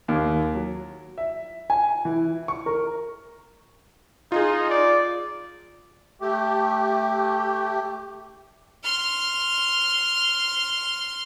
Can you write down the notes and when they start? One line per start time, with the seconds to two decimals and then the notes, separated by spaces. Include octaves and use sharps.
0.08 D#2
0.54 F#3
1.18 E5
1.70 G#5
2.05 E3
2.48 C#6
2.66 A#4
4.32 D#4 F4 G#4
4.70 D5
6.21 A3 G4
8.84 C6 F6